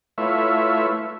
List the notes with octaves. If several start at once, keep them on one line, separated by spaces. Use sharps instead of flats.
A3 E4 F4 B4 C#5 E5